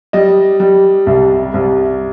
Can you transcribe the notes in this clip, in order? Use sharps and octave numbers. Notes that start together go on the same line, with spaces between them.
G3 D#5
G3
C2
C2